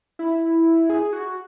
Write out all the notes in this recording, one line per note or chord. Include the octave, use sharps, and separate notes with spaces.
E4
G#4
F#4